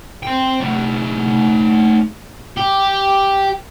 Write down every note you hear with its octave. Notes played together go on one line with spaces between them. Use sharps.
C5 G5
A3 D#4
G4